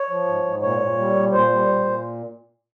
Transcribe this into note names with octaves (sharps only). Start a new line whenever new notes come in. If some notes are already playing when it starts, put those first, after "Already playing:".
Already playing: C#5
F3
G#2
G#2
A#2 C#5
A#2
G3
A#2
A#2 C5
G3
A#2
A#2